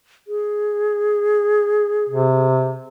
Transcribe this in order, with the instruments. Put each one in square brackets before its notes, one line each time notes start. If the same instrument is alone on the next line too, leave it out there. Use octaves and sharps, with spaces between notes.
[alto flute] G#4
[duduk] C3